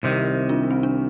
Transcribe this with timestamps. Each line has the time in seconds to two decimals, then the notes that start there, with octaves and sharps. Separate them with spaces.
0.03 C2 C3 D#3
0.49 D4 F4
0.71 C4
0.83 D4